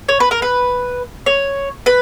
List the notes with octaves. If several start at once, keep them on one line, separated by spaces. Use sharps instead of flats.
C#5
B4
A#4
B4
C#5
B4